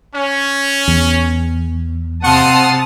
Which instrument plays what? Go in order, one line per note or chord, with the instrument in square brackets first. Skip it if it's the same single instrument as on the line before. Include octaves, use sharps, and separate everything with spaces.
[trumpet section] C#4
[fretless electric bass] E2
[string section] C3 A5 D#6 [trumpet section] F5 F#5 C6